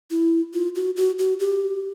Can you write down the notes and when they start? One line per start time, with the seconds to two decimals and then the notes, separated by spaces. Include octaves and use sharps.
0.11 E4
0.54 F4
0.75 F#4
0.96 F#4
1.19 F#4
1.40 G4